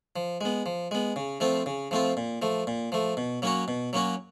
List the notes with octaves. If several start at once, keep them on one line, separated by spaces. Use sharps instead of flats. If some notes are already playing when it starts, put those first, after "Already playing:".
F3
G#3 B3
F3
G#3 B3
C#3
F3 A3 C4 F4
C#3
F3 A3 C4 F4
A#2
F3 A3
A#2
F3 A3
B2
F#3 A#3 C#4 F#4
B2
F#3 A#3 C#4 F#4